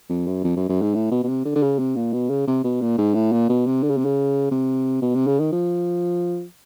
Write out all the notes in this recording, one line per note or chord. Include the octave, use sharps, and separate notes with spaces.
F2
F#2
F2
F#2
F#2
G#2
A2
B2
B2
C3
D3
D3
C#3
C3
A#2
B2
C#3
C3
B2
A#2
G#2
A2
A#2
B2
C3
D3
C#3
C3
C#3
C3
B2
C3
C#3
D#3
F3